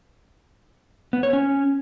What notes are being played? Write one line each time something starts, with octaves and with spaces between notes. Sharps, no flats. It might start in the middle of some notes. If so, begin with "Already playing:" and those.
B3
C#5
C#4